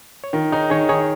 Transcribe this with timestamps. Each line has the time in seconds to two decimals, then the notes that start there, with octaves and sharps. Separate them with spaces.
0.24 C#5
0.33 D#3 F4 A#4
0.52 D#4 G#4 C#5
0.70 D#3 G#4 C#5
0.89 D#3 G#4 C#5